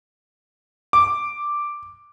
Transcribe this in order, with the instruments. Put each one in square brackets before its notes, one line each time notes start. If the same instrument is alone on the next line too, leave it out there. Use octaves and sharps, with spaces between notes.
[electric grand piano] D6